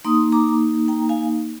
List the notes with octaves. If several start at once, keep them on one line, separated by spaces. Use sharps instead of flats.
A#3 D#4 C6 D#6
A#5 D6
G5 A#5
F5 G#5